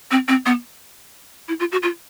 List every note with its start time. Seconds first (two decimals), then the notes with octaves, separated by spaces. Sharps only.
0.11 C4
0.28 C4
0.46 B3
1.48 E4
1.60 F4
1.72 F#4
1.83 F4